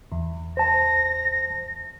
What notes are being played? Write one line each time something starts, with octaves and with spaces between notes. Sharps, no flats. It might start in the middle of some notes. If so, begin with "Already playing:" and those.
E2
C5 A5 A#6